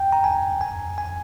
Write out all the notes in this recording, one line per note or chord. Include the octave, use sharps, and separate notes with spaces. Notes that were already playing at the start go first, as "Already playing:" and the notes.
Already playing: G5
A#5
G#5
G#5
G#5